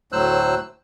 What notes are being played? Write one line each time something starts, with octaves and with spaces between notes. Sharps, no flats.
D2 A2 F#3 C5 E6 F#6